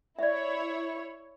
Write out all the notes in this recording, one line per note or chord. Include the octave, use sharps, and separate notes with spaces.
E4 C#5 D5 E5